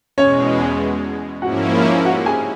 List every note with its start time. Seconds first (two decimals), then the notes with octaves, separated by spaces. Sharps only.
0.17 E2 B2 G#3 C#4 C#5
1.42 G#2 F3 A#3 C#4 E4 F#4 F#5
2.05 F#4 F#5
2.26 G#4 G#5